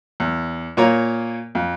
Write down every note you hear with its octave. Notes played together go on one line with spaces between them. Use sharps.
E2
A#2 A#3 F4 C#5 A#5
F2